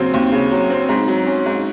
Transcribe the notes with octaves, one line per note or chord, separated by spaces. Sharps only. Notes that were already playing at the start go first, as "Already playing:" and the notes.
Already playing: D#2 C#3 F#3 C4
D#2
C#3
F#3
C4
G#2
F#3
C#4
G#2